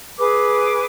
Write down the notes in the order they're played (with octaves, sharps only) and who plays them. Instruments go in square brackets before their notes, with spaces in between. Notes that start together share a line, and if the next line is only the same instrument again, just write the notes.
[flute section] G#4 B4 D6